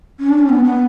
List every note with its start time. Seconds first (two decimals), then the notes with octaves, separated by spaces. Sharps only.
0.19 C#4
0.29 D4
0.39 C#4
0.49 B3
0.64 B3